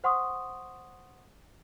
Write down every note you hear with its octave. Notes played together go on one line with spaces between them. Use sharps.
C5 F#5 C6 C#6 D#6